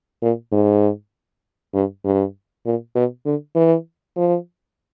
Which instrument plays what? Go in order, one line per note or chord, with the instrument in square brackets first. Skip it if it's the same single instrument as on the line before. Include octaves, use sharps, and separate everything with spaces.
[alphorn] A#2
G#2
G2
G2
A#2
B2
D3
E3
F3